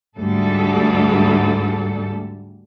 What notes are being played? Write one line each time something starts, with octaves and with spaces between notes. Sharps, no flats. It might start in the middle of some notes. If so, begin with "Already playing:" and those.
D2 G#2 G3 A4